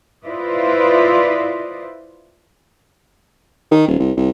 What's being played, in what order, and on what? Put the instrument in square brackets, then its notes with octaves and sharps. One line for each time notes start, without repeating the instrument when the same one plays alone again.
[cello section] E4 F4 B4 C5 D5 D#5
[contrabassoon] D#3
D#1
C2
C2